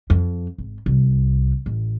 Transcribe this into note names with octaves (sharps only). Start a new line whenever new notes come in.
F2
G#1
C2
A1